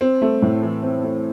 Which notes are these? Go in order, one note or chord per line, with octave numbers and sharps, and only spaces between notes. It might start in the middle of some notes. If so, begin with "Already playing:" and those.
C4
A3
A2
E3
C4
A3